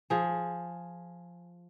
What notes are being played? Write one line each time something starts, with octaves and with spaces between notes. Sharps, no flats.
F3 G#4